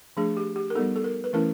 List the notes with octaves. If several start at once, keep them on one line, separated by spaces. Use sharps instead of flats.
F3 A3 D4 G#4
G4
G4
A#4
G3 B3 D#4 A4
A4
A#4
B4
E3 A3 C#4 E4 A#4